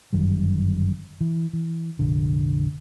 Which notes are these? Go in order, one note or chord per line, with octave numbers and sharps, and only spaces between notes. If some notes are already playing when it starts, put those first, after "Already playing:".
G1 F#2 D#3 G3
E3
E3
F1 A#1 D3